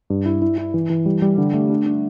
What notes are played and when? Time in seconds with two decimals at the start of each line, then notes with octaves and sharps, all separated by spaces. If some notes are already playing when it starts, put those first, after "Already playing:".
0.10 G2
0.26 E4
0.42 E4
0.58 E4
0.74 E3
0.90 E3
1.06 G3
1.22 G3
1.38 D3
1.54 A3
1.70 D4
1.86 D4